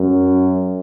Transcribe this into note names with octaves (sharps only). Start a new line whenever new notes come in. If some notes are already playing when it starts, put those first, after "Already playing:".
Already playing: F#2